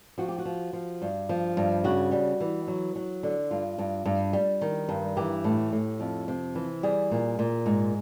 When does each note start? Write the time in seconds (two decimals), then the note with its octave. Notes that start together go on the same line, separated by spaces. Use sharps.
0.18 F3 F#4
0.28 G4
0.38 F#4
0.45 F3
0.73 F3
1.02 G2
1.29 F3
1.57 G2
1.84 C#3 F#4
2.12 G3
2.40 E3
2.68 F#3
2.96 F#3
3.23 D3
3.51 G2 F4
3.78 G2
4.05 G2
4.33 G3
4.61 D#3
4.89 G2
5.17 E3 G4
5.44 A2
5.72 A2
6.00 F2
6.28 C3
6.55 E3
6.83 G3 G#4
7.11 A#2
7.39 A#2
7.66 G#2